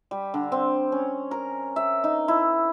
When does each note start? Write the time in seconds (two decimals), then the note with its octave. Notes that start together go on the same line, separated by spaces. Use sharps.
0.11 G3
0.34 D3
0.52 C4
0.92 C#4
1.31 A#4
1.76 E5
2.04 D#4
2.28 E4